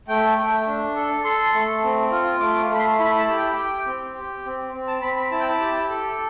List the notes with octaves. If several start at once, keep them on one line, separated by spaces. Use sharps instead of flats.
A3 G5
A3
D4
A4
A4 C6
A3
C4
F4
A3 D6
A3 B5
C6
E4 B5
B5
A5
G4
G5
G4
C4
G4
C4
C4
A5
C4 B5
B5
E4 A5
G5
A5
G4
A4